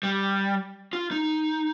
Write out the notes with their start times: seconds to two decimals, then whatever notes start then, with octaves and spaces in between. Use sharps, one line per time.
0.03 G3
0.93 F4
1.11 D#4